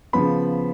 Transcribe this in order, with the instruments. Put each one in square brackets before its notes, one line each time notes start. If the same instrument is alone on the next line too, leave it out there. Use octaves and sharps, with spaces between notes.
[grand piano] C#3 F3 B3 B5